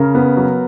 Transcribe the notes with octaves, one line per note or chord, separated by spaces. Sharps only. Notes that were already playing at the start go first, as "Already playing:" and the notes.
Already playing: C#3 A#4
B3
F#3